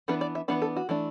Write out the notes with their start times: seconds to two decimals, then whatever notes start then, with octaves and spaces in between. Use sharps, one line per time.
0.08 E3 B3 D4 B4
0.21 D5
0.35 E5
0.48 E3 B3 D4 B4
0.62 A4
0.76 F#4
0.89 E3 A3 D4